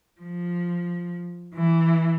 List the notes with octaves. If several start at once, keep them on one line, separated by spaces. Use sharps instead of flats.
F3
E3